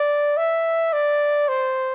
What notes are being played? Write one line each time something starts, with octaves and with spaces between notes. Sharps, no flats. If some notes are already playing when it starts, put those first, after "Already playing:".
Already playing: D5
E5
D5
C5